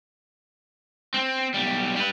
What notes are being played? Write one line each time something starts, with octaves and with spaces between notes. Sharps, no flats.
C4
B1 G3
G3 B4